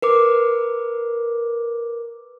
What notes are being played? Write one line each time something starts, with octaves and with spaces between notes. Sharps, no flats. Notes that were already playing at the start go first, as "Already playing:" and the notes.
A#4 B4 D6